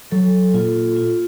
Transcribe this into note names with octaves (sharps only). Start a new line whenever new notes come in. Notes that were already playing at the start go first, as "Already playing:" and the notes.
F#3 A4
A#2 F4
F4